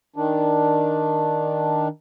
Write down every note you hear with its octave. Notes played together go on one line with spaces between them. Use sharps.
D#3 D4